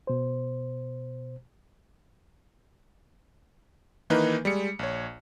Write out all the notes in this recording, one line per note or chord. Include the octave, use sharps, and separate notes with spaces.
B2 C5
D#3 E3 A#3 D#4 B4
G3 G#3 C#7
A#1 C#5